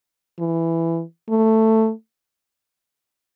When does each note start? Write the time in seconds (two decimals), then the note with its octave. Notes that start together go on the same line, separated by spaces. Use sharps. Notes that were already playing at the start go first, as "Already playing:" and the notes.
0.40 E3
1.29 A3